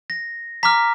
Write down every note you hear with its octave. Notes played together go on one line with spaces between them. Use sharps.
A#6
A#5 D6 F6 B6